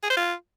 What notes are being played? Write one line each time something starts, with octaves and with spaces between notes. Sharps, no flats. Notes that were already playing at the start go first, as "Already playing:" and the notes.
G#4
C5
F4